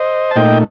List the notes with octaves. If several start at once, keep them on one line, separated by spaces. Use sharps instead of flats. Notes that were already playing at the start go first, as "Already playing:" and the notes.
Already playing: C5 D#5
A5
A#2 A3 D#4 D#5 G5